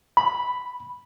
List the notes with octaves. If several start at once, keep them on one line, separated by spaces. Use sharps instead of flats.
B5